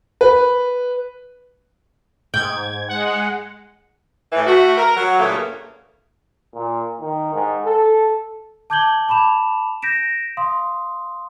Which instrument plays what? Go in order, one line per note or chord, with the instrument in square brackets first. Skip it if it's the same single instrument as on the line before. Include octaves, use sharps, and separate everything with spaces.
[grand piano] B4
[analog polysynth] G#2 G#6 [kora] G5
[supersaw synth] G#3 [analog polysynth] F#5
[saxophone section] A2 E3
A3 F#4
A#4
F#3
G2 A#2 C#3 A3 A#3
[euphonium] A#2
D#3
G#2
A4
[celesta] A5 D6 G6 G#6 F#7 G7
A5 B5 D6 E7 F7
G6 A#6 B6 D7 E7
F5 C6 D#6